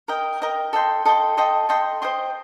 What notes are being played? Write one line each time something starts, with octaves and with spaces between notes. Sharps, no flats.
A#4 D#5 G5
A#4 D#5 G5
A4 D#5 G5 C6
A4 D#5 G5 C6
A4 D#5 G5 C6
A4 D#5 G5 C6
C5 D#5 G5 C6